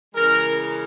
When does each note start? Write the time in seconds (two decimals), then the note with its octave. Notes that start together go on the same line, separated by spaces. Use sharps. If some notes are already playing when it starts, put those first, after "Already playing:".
0.14 C#3 E3 G#3 A#4